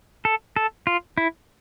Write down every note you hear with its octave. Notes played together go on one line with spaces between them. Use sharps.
A4
A4
F4
E4